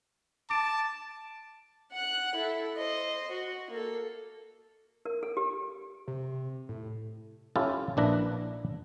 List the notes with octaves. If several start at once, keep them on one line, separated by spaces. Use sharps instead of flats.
A5 D6 D7
F#5 F#6
E4 A4
C5 D#5
F#4
A#3 A4
A#4
A4
G4
C3
A2
C#4 E4 F4 G4 A4
A#1 A#3 D4 E4 B4 A#5